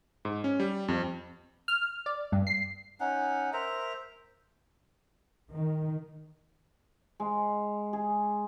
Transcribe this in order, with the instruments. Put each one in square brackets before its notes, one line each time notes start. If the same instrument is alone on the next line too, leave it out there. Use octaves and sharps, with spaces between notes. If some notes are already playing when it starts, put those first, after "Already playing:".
[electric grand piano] G#2
C#4
G3
F2
[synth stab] F6
D5
G2
C7
[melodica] C#4 D#4 F#5
A#4 C5 E5 A#5
[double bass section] D#3
[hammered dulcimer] G#3
G#4